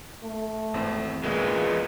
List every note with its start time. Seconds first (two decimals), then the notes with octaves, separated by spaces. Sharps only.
0.24 A3
0.74 G#1 E2 C4
1.24 E2 A#2 G#3 B3